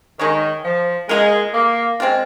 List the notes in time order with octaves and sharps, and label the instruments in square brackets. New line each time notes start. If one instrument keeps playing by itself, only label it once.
[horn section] D#3 [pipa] G#3 D#4 A#4 C#5
[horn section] F3
[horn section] G#3 [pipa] A#3 F4 A#4
[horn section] A#3
[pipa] G#3 C4 F4